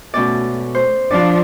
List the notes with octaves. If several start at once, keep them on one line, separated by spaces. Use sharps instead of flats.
B2 A3 C#4 D5
C5
F3 D4 F4 D5